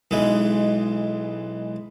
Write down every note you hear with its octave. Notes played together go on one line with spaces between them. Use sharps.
B1 E3 G#3